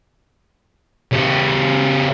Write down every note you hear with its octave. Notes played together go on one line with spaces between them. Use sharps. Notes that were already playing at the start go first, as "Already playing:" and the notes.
C#3 G4